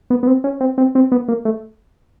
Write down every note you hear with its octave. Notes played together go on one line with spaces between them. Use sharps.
B3
B3
C4
C#4
C4
C4
C4
B3
A#3
A3